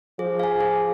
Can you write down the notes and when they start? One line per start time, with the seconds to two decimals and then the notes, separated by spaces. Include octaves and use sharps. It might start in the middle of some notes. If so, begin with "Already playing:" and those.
0.19 F3 G#4
0.39 F5 G#5
0.60 G#4